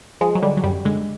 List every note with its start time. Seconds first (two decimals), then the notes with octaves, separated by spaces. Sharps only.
0.21 F3 G#3
0.35 F#3
0.42 D3 G3
0.57 F#3
0.64 F#2 G3
0.85 D3 G#3